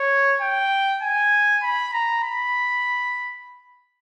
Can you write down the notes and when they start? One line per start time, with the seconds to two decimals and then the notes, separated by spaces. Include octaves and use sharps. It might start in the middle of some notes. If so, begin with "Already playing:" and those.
Already playing: C#5
0.41 G5
1.02 G#5
1.63 B5
1.93 A#5
2.23 B5